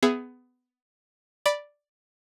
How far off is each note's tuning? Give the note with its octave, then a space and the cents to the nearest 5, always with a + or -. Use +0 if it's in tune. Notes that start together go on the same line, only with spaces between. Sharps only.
B3 +20 G#4 +0 E5 +20
D5 +0 B5 -10